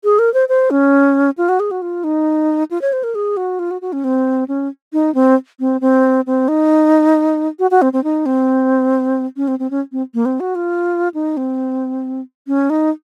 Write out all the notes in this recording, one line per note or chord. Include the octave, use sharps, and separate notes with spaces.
G#4
A#4
C5
C5
C#4
F4
F#4
G#4
F#4
F4
D#4
F4
C#5
C5
A#4
G#4
F#4
F4
F#4
F#4
C#4
C4
C#4
D#4
C4
C4
C4
C4
D#4
F#4
F#4
C4
C4
D#4
C4
C#4
C4
C4
C#4
C4
A#3
C4
F#4
F4
D#4
C4
C#4
D#4